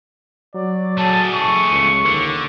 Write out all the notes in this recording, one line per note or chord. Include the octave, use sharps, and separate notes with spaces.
F#3 D5
A3 G#4 A5
F#1 C#6
C#2
D#2 D3